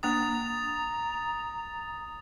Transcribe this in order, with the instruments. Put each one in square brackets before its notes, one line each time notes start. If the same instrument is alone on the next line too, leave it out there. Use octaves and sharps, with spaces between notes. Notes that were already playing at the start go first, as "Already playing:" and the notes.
[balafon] A#3 D4 G5 [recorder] A#5 [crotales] D#6 A6 F7